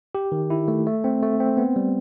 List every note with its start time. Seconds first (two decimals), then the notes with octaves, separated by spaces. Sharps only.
0.15 G4
0.32 D#3
0.50 E4
0.68 A3
0.87 A3
1.04 C4
1.22 A3
1.40 C4
1.57 B3
1.76 G3